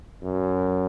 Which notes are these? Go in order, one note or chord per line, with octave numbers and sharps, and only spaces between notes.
F#2